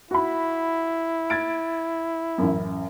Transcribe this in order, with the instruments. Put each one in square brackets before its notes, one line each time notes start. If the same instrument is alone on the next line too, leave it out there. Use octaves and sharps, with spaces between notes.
[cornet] E4 [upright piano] F#4 B5
[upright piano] G#6 A6 D7
A1 F#2